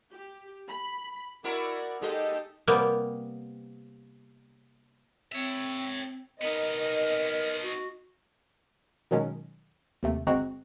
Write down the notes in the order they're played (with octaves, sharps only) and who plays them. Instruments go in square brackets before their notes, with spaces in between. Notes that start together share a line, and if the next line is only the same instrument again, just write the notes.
[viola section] G4
B5
[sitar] E4 F#4 A#4 [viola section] D5
[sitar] G#3 D#5 [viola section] D#4 G4 A4
[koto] C3 G3 A#3 B3
[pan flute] C4 [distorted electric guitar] C#5 E5
[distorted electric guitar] B3 D#4 [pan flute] A#4 [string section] D#5
[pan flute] F#4
[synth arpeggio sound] B2 D#3 F#3 G#3 C#4
D#2 C3 A3
G1 G#3 C4 F#4 A#5 F#6